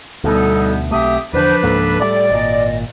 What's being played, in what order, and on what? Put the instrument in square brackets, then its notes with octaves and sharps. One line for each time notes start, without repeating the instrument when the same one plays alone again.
[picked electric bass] D2 B2 [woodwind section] G3 B3 D#4 [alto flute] A4
[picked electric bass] B1 A3 [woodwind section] C4 G4 D#6 [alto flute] E5
[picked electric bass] E2 D3 [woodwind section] F3 D4 B4 [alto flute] C5
[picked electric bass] C#2 G#2 A#3 [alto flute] A4
[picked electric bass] A2 C3 G3 [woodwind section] D5
[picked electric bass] G#1 A#2 [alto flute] D#5